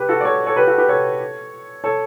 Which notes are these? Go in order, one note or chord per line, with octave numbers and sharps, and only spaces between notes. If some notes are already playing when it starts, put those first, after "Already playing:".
Already playing: G4 B4
F#4 A4
D5
A4 C#5
A4 C#5
G4 B4
F#4 A4
G4 B4
A4 C#5
A4 C#5